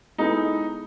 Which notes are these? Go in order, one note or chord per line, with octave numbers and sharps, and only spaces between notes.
G#3 B3 D#4 E4 A4